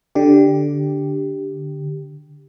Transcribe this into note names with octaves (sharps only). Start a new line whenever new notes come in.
D3 G4